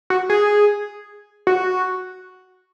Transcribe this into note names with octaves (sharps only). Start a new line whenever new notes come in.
F#4
G#4
F#4